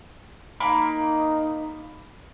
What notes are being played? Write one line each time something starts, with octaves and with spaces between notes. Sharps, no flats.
A#3 D#4 B5